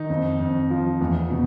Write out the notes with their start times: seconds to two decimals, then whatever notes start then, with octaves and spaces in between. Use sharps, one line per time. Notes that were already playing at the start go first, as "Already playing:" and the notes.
Already playing: D#3 D#4
0.10 F2
0.40 F2
0.70 F3
1.01 E2
1.30 B2